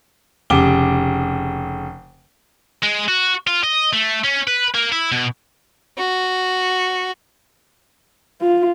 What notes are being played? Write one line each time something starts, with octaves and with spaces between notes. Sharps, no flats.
F1 C#3 D6 G7
G#3
F#4
F4
D#5
A3
C#4
B4
A#3
E4
B2
F#4
F4